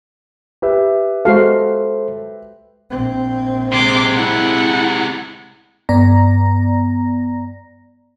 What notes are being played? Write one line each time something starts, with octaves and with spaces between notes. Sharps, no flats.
G4 B4 E5
G#3 F#4 A4 C5 F5
A#1 C4
C3 G#3 C6 D6
E4 F#5
G2 B3 D5 A#5 A#6